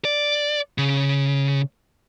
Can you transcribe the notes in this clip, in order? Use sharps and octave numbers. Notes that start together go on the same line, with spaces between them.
D5
C#3